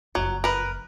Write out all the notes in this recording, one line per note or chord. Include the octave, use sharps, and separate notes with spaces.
F#1 F2 F#3
A#4 B4